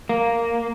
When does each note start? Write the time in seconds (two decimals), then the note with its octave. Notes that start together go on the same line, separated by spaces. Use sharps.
0.09 A#3